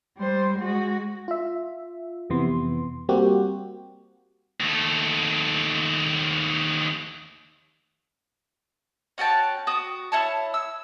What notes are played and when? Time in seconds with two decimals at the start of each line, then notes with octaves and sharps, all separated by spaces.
0.18 G3 C5
0.57 G#3 F#4
1.28 F4 E5
2.30 F2 C3 E3 B3 C6
3.09 G3 A#3 C4 F#4 G4
4.60 D#2 A3
9.18 C#4 F#4 G5 A5
9.67 F#4 D#6
10.12 E4 C#5 A5
10.54 E6